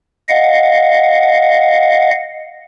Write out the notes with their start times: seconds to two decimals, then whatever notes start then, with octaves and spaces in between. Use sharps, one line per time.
0.29 D#5 F5 F#5